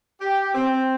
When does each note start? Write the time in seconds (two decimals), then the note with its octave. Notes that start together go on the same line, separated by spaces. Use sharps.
0.20 G4
0.54 C4